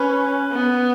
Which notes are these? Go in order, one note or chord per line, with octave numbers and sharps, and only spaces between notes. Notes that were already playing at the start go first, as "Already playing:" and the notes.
Already playing: C#4 B4
B3